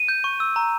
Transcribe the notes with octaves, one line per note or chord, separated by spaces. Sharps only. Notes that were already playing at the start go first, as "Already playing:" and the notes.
Already playing: D#7
G6
C#6
E6
A#5